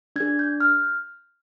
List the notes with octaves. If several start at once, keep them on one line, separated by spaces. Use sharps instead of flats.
D4 G#4 G#6
G6
F6